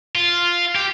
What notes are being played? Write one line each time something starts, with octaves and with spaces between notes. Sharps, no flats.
F4
G4